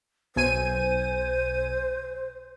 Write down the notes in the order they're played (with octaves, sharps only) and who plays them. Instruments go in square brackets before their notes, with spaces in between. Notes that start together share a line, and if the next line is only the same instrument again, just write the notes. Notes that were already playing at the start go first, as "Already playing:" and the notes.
[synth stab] B1 G#5 D#7 [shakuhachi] C5